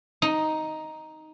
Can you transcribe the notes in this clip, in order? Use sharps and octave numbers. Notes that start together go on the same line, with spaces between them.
D#4